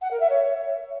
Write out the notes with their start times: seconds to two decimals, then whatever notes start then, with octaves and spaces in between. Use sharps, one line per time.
0.01 F#5
0.11 A#4
0.20 E5
0.29 C#5